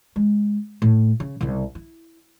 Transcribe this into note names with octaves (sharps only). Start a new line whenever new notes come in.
G#3
A2
C#3
C2 C#3
E4